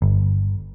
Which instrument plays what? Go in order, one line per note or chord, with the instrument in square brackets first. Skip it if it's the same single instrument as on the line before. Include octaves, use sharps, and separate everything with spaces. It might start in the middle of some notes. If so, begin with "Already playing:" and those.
[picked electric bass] G1